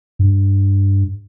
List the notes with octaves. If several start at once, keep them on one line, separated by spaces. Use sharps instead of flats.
G2